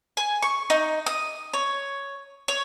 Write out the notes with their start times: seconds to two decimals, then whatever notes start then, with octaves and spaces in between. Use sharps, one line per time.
0.17 G#5
0.42 C#6
0.70 D#4
1.06 D#6
1.53 C#5
2.48 C#5